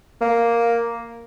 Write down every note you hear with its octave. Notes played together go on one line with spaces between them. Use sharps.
A#3